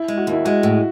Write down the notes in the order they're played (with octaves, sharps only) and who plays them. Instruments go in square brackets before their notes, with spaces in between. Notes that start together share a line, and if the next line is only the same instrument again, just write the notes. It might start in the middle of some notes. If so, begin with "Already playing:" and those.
Already playing: [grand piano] E4
[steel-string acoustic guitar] G#3
[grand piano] F#4
[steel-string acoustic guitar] D#2
[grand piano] E4
[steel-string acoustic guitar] G#3 [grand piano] F#4
[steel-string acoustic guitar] A2